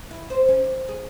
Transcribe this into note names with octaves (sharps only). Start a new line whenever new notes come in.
E4
C5
C#4
D#2
G#4